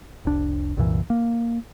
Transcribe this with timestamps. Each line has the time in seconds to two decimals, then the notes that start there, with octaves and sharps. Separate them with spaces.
0.25 F1 C2 D4
0.77 C2 F#2 A#2 E3
1.10 A#3